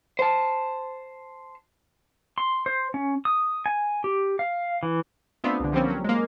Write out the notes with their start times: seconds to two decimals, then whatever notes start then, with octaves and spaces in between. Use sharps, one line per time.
0.19 C5 A5
2.38 C6
2.66 C5
2.94 C#4
3.25 D#6
3.66 G#5
4.04 G4
4.39 F5
4.83 E3
5.44 A3 B3 C4 D4 F4
5.60 C2 D3
5.72 D3 F3 G3 A#3 C4 C#4
5.88 F#3 C#4
6.04 G#3 A#3